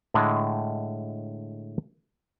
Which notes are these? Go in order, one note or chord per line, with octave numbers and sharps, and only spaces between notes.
A2 D3 G#3 D#5 A5